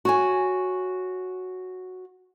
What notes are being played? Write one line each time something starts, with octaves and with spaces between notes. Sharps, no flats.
F#4 C#5 G#5